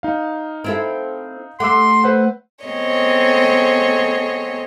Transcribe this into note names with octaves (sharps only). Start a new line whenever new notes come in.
D#4 F5
C4 E4 A4
A3 F#5 C6 D6 E6
B4 C5 F#5
B3 C4 G#4 A4 C#5 D#5